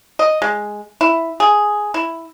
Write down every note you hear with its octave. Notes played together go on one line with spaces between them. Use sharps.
D#5
G#3
E4
G#4
E4